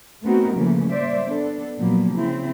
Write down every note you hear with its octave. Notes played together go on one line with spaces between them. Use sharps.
A3 B3 C4 D#4 F#4 A#4
C#3 E3 F3 A3 A#3
G3 A#3 C5 D5 E5
B3 D4 A4
A#2 F3 F#3 A#3 B3
C#3 C4 E4